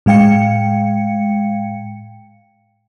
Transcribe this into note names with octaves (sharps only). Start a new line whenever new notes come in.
A2 G#3 F5 G5 C#7